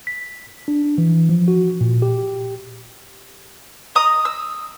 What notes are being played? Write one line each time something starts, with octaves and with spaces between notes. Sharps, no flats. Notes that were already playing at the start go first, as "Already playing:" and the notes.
B6
D4
E3
F3
F#4
A#2
G4
D#5 A#5 D#6
E6